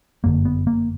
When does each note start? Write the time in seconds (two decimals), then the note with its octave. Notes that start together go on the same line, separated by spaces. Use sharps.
0.24 G1 F#2 D3 A#3
0.45 B3
0.67 A#3